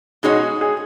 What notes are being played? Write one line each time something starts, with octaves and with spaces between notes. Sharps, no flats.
B2 G#3 D#4 F#4 G#4 C#5
G#4